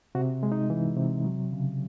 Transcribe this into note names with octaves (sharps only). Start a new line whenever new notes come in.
C3 F#4
G#3
D#4
E3
C3
F#3
C#3